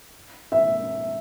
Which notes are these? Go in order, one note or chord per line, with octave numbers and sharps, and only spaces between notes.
E5